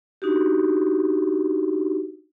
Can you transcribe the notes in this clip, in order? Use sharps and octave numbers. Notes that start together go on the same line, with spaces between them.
D4 D#4 F#4 G4